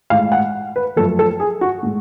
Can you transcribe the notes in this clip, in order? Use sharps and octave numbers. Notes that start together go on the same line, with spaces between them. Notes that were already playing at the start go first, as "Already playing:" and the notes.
A2 G#3 F5
F#5
B4
F#2 F3 A3 A4
A4
G#4
F#4
A2 G#3